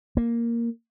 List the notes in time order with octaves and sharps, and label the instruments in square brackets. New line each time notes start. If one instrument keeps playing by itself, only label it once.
[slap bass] A#3